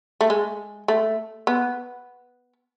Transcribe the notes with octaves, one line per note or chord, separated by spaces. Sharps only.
A3
G#3
A3
B3